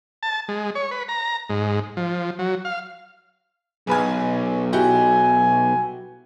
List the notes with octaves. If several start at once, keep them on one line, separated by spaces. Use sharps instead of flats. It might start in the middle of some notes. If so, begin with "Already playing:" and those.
A5
G#3
C#5
B4
A#5
G#2
F3
F#3
F5
B1 G#4 B4 G#5
E4 F#4 G4 G#5